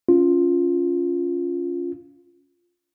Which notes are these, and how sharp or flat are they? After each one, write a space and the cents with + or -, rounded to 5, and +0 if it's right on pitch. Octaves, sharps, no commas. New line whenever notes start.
C#4 +15 F4 +0